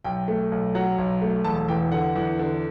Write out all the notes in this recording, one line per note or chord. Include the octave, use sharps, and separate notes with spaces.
B1 G5
A3
B1
F#3 F#5
B1
A3
E1 A5
E2 G5
D3 F#5
E2
D3